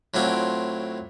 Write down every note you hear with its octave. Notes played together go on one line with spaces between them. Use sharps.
A2 F#3 C4 D4 F4